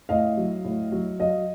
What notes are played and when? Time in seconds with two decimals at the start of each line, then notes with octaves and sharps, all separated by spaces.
0.09 A2 D#5 F5
0.37 F#3
0.65 A2
0.92 F#3
1.19 F#3 D#5 F5